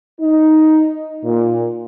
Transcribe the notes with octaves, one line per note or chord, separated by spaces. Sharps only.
D#4
A#2